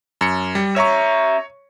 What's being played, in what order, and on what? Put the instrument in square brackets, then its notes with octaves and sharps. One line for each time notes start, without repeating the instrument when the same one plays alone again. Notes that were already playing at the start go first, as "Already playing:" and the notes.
[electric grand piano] F#2 C#7
G3
[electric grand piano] C#5 C#6 [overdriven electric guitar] E5 A#5